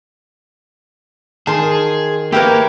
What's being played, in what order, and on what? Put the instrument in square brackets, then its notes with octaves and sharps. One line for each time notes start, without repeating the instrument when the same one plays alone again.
[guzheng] D#3 C6 [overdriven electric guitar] G#4 [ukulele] A5
[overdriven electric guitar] A#3 [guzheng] E4 A#4 C#5 [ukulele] G4 B4